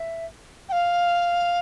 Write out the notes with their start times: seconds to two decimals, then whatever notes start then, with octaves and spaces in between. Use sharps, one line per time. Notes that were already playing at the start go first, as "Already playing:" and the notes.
Already playing: E5
0.69 G5
0.72 F5